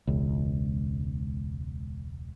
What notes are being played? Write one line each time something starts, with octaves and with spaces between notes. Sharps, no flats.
E1 C#2